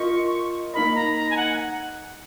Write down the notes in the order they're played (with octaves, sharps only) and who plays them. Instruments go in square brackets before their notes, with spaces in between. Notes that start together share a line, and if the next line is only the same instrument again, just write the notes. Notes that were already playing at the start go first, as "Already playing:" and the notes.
Already playing: [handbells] F4 A#4 D#5 [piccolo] C#6
[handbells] A#3 D#4 A#4 D#5 [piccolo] B5
[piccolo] A#5
A#5
G#5
F#5